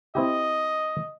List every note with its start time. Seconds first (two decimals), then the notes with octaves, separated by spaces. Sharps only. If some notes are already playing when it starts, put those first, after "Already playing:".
0.15 C4 E4 G4 D#5